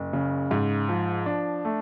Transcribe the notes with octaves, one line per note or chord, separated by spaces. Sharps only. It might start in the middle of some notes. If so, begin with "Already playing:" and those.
Already playing: F#1
C#3
G#2
F3
D4
A3